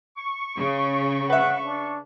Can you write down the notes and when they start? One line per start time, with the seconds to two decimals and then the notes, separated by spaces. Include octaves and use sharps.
0.17 C#6
0.57 C#3
1.30 B4 E5 F#5
1.65 D4